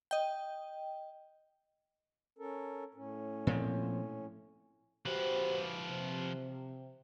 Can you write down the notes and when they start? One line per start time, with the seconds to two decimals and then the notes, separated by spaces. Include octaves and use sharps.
0.11 D#5 G5
2.39 C#4 A4 A#4
2.95 A2 C#4
3.47 A#2 F3 C4
5.06 F3 F#4 G4 B4 C5
5.89 C3